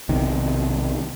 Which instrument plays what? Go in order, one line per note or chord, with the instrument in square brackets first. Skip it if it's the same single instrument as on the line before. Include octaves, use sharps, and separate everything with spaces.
[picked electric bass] B1 C3 D#3